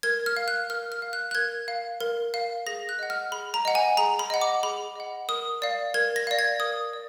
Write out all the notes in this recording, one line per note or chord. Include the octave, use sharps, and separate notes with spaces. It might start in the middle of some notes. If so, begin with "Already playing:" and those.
A#4 G#6
F6
F5
F#6
A#4 F6
F6
F5
F#6
F#6
A#4 G#6
F5
A#4
F5
G#4 A#6
F#6
D#5 F#5
F6
G#4 B5
A#5
D#5 F#5
G#5
G#4 A#5
B5
D#5 F#5
D6
G#4 B5
D#5 F#5
A#4 D#6
D5 F5
A#4 G#6
A#6
D5 F5
G#6
A#4 D#6
D5